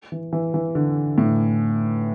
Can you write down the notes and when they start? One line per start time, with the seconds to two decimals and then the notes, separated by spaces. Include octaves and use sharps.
0.12 E3
0.33 E3
0.54 E3
0.75 D3
1.18 A2